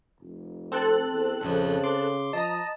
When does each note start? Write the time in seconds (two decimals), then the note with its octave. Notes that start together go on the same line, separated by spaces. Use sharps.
0.21 F1
0.72 C4 A4 F#6
1.11 E2
1.41 A#1 F2 C#3 F3
1.84 C6 D6
2.33 F3 D#5 A5 A#5